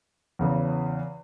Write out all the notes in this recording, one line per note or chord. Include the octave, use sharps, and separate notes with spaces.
E2 C#3 E3